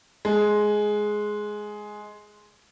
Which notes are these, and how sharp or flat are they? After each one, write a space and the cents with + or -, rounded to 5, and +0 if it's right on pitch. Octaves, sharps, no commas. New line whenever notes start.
G#3 +10